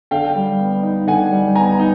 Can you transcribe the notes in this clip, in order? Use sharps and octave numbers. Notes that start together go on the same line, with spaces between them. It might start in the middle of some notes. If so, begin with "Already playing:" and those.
D3 F5 G5
G3
B3
D#4
D3 F#5 G#5
G3
B3 G#5 A#5
D#4